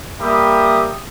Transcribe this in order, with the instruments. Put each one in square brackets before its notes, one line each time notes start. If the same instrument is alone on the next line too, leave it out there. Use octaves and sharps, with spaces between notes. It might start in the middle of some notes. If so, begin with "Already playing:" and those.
[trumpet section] G3 A#3 G4 E5 B5 D#6